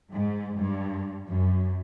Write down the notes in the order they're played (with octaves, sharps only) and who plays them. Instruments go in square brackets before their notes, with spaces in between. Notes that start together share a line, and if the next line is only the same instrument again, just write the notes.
[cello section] G#2
G2
F#2